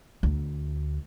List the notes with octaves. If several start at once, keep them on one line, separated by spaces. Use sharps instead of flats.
D2